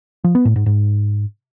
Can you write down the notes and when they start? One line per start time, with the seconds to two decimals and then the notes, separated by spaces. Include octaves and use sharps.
0.24 F3
0.35 B3
0.45 A2
0.56 G#2
0.66 G#2